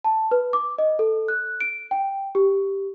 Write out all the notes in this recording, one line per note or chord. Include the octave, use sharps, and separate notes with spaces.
A5
B4
D6
D#5
A4
F#6
D7
G5
G4